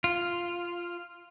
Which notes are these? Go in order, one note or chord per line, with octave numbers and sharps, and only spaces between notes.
F4